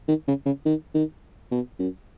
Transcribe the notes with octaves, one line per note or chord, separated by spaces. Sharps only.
D#3
C#3
C#3
D#3
D#3
B2
F#2